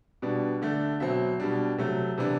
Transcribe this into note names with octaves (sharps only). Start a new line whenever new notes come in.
B2 G3 B3 D4
D3 A3 D4
B2 F#3 C4 E5
B2 G3 D4
C3 F#3 A3
C3 E3 B3 D4